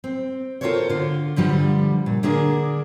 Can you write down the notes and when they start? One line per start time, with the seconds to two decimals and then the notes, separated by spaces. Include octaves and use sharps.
0.04 C4
0.61 F4 F#4 A4 A#4 C5 C#5
0.89 D3 F4
1.36 G2 D3 F3 G3
2.06 A#2
2.23 D3 A#3 D4 G#4 A#4